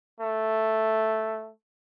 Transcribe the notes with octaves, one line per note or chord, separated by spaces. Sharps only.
A3